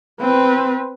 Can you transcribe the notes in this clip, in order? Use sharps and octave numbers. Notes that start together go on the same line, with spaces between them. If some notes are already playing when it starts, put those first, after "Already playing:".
C4 B4